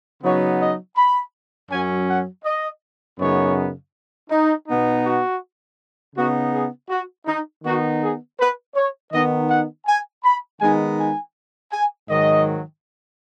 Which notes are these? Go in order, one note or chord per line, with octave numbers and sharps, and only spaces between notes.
C#3 F#3 B3 D#4 C#5
D#5
B5
F#2 F#3 C#4 G#5
F#5
D#5
F#2 C#3 B3 D#4 C#5
D#4
B2 B3 D#4
F#4
C#3 B3 D#4 F#4
G#4
F#4
D#4
D#3 B3 D#4 F#4
G#4
B4
C#5
D#3 B3 D#4 D#5
F#5
G#5
B5
D#3 G#3 B3 D#4 G#5
G#5
G#5
G#2 D#3 F#3 D#5